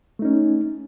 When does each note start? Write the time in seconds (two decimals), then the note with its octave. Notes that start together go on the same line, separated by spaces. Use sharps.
0.19 A3
0.22 D#4
0.25 C#4